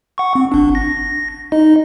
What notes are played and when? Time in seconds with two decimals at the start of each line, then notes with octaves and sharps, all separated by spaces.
0.18 F#5 C#6
0.35 C4
0.52 G1 D4
0.75 A#6
1.52 D#4 D#5